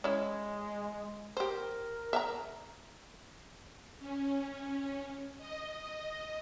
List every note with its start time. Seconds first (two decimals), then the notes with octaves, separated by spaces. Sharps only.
0.04 G#3 C#4 E4
1.37 G4 A#4 C5
2.13 E5 F5 A#5
3.99 C#4
5.38 D#5